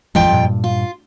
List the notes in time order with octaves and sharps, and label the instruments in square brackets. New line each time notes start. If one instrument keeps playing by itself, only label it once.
[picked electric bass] A1 E3 G#3 [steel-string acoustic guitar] F2 F4 G5
[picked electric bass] G2 A#2
[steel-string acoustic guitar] F4